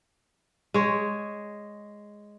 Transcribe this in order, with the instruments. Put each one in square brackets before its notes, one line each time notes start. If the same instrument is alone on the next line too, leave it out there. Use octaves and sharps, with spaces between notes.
[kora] G#3 C#5